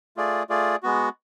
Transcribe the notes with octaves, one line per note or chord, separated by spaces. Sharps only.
A3 F4 G#4 D5
A3 F4 G#4 D5
G#3 B3 F#4